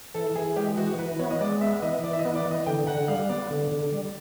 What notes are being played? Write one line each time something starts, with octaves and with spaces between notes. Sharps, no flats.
E3 A4
E3 G#4
G#3 G4
E3 F#4
E3 B4
B3 C#5
D#5
G#3 D5
B3 E5
E3 D#5
E3 D5
E5
D#5
B3
D5
E3
D#5
D3 G5
D3 F#5
G3 F5
B3 D5
D3
D3
G3